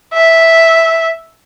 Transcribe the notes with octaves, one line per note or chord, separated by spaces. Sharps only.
E5